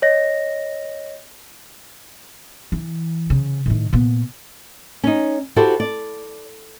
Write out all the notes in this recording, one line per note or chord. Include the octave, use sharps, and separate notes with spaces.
C#5 D#5 A#6
E3
C#3
A2 D#3
A#2 B3
C#4 D#4
E4 F#4 G4 A4 C5
D5